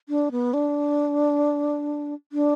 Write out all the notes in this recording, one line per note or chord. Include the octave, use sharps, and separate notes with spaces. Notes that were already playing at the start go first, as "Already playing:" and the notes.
D4
B3
D4
D4